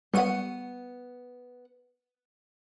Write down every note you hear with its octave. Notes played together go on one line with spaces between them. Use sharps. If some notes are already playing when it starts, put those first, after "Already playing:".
G3 B3 F#5 C#6 D#7